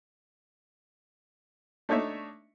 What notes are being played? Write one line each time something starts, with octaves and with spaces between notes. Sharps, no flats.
A3 D4 D#4 C#5 E5